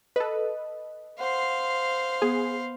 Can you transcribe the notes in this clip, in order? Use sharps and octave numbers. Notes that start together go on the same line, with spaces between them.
A4 B4 D#5
C5 F5 F#5 C6
B3 G#4